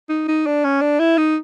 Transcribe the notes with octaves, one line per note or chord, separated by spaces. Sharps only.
D#4
D#4
D4
C#4
D4
E4
D#4